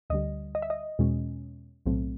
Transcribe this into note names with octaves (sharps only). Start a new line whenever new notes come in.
D2 D3 G3 D#5
D#5
E5
D#5
E2 B2 G#3 C#4
B1 A2 F#3 A3 C4